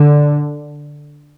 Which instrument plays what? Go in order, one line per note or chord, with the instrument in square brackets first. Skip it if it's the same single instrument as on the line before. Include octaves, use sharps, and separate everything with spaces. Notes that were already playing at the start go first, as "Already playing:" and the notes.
Already playing: [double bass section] D3